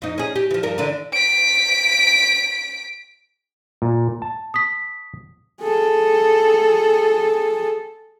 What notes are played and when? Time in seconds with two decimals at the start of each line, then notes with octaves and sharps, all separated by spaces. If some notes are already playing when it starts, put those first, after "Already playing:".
0.02 F2 D#4
0.18 C#4 G#4
0.36 G4
0.51 E3 F3
0.63 G2 F3 A#4
0.78 D3 E3 D4
1.12 B6 D7
3.82 A#2
4.22 A5
4.54 D#6 B6
5.62 G#4 A4